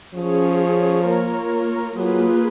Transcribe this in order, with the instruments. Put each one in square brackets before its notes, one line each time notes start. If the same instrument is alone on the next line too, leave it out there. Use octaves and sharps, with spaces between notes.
[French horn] F3 [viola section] C#4 G#4 C#5
[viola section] A#3 F4 A#4 C#5
[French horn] F#3 [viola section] A#3 F4 G#4 B4